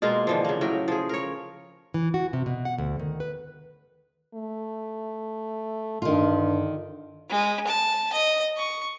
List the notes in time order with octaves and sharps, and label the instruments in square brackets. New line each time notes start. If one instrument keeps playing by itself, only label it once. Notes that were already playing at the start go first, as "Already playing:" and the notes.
[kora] B2 G#3 A#3 F4
D3 E3 F3
C#3 A#3
A2 F#3 A#4 G5
F3 G#4
A#4 C#5
[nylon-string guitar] E3
F#4
C3
B2
F#5
D2
D#3
B4
[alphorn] A3
[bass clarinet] G2 [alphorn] D3 [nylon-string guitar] D#3 F4
[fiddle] G#3
A5
D#5
C#6